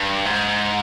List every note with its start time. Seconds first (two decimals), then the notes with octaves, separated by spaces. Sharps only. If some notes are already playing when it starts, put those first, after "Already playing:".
Already playing: G2
0.25 G#2